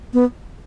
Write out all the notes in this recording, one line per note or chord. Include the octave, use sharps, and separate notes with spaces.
B3